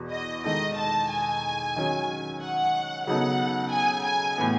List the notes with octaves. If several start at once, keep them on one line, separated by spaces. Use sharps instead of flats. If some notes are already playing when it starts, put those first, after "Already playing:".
Already playing: E2 B2
D#5
D#3 G#3 D#4 A4 D#5
A5
G#5
D#3 F#3 C#4 G#4
F#5
C#3 F#3 B3 D#4 A4 F#5
G#5
G#5
A2 E3 B3